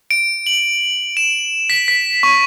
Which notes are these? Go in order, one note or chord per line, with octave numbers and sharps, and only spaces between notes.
D7
F#7
E7
B6
B6
C#6